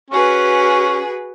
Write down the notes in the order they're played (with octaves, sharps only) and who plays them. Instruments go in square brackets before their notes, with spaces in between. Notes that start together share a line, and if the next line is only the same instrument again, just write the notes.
[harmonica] C#4 [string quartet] F#4 G#4 B4